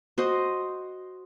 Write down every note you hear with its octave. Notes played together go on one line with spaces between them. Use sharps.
F#4 C5 D#5